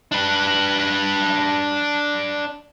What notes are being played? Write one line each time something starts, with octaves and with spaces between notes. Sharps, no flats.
D4 B4